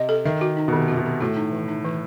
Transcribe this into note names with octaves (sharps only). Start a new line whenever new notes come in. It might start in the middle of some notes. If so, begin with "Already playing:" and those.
Already playing: C3 D#5
A4
D#3 E5
F#4
D#4
B2
C3 D#3
C3 F#4
B2
D#3
A2 F#4
D#4
E3
D#4
E3